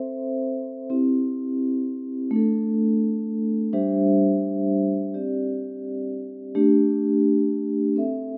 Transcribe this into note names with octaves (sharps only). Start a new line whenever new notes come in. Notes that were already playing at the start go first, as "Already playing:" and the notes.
Already playing: C4 A4 C5 E5
C4 E4 G4
A3 D4 A4
G3 D4 G4 C5 E5
C4 G4 D5
A3 D4 G4
C4 A4 E5